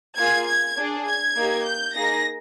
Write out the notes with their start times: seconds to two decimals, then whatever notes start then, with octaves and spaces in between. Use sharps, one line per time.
0.18 A#3 F4 G#4 G#6
0.47 G#6
0.78 D4 G#4
1.07 G#6
1.36 A#3 D#4 G4
1.65 G6
1.95 A#3 D#4 G#4 A#6